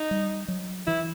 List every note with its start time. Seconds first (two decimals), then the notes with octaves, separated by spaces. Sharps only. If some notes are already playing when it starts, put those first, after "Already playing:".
Already playing: D#4
0.11 G3
0.48 F#3
0.87 E3 E4